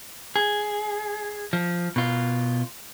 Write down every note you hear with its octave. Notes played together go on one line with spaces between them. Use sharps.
G#4
F3
B2 F4